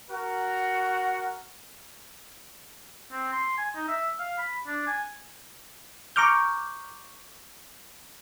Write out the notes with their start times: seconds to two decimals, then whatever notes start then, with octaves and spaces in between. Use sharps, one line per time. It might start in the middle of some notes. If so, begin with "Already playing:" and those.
0.11 F#4 A#4 F#5
3.12 C4
3.33 C6
3.58 G#5
3.75 D#4
3.88 E5
4.19 F5
4.38 B5
4.67 D4
4.87 G#5
6.16 A#5 C#6 D6 F6 G6